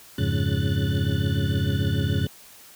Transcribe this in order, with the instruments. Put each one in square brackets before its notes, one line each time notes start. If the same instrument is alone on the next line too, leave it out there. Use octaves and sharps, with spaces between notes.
[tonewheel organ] F2 G#2 C#3 F#6 A6